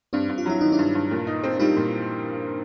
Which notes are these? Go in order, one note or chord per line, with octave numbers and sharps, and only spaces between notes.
G2 C4 D4
G2
F4
F#3 E4
D#3 D#4
D4 E4
G2
G2
A#2
D#4
C4
G3 D#4 F4
A#2